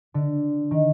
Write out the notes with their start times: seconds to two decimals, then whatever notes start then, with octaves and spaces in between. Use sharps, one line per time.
0.14 D3
0.71 D#3